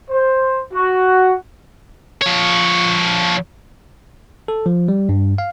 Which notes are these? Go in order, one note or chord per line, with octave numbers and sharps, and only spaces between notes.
C5
F#4
F3 C#5
A4
F3
G3
G2
F5